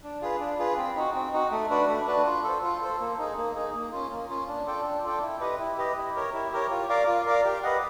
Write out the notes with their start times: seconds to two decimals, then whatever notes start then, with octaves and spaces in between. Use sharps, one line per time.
0.03 D4
0.21 F4 G#4 B4
0.40 D4
0.59 F4 G#4 B4
0.77 C4
0.96 D#4 F#4
1.14 C4
1.33 D#4 F#4
1.51 A3
1.70 D4 F#4 B4
1.88 A3
2.07 D4 F#4 B4
2.26 F4
2.44 A4 C5
2.63 F4
2.81 A4 C5
3.00 A#3
3.19 D#4 G#4
3.37 A#3
3.55 D#4 G#4
3.74 A#3
3.92 C#4 F4
4.11 A#3
4.29 C#4 F4
4.48 D4
4.66 F4 A4 D5 G5
4.85 D4
5.04 F4 A4 D5 G5
5.22 E4
5.41 G4 B4 D#5
5.59 E4
5.77 G4 B4 D#5
5.96 E4
6.15 G4 A#4 C#5
6.33 E4
6.52 G4 A#4 C#5
6.71 F4
6.89 A#4 D5 F5
7.07 F4
7.26 A#4 D5 F5
7.44 G4
7.63 B4 D#5 F#5